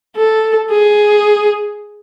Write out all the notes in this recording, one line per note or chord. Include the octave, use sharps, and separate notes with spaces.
A4
G#4